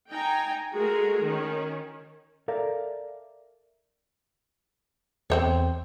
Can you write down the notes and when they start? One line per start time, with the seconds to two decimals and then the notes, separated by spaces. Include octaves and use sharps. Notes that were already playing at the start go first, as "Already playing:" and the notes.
0.10 D#4 G5 G#5 A#5
0.72 G#3 A3 F#4 G#4 A#4
1.22 D#3 C#4
2.48 A4 A#4 D5 E5 F5
5.30 E2 C4 C5 C#5